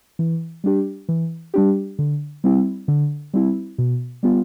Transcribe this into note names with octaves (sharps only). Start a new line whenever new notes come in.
E3
G3 D4 G4
E3
G3 D4 G4
D3
G3 C4 E4
D3
G3 C4 E4
B2
G3 B3 F4